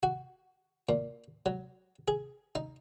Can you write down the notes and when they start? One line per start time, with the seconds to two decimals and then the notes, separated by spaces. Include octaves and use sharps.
0.03 F#4
0.89 A#2
1.46 F#3
2.08 G#4
2.55 D#4